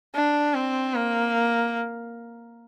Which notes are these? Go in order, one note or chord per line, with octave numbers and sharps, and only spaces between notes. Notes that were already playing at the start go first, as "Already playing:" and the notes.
D4
C4
A#3